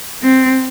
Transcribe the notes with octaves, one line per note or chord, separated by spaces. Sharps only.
C4